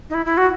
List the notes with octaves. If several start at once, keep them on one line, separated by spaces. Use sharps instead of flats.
D#4
E4
E4
F#4